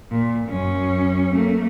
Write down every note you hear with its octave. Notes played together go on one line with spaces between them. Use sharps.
A#2
F#2 C#4
A3 A#3